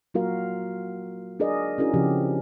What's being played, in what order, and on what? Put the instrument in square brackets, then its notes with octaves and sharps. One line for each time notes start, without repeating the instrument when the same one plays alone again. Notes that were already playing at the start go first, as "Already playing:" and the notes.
[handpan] F#3 A#3 F4 F#4 A#4 F5
D4 G#4 A#4 D5 D#5
C#4 D4 E4 F#4 G#4 A#4
C#3 F3 C4 C#4 G4